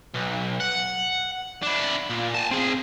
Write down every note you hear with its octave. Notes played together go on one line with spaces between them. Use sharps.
B1
F#5
D4 E4
A#2
G#5 A5
C4 G#4